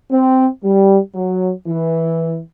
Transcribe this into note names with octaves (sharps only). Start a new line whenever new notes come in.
C4
G3
F#3
E3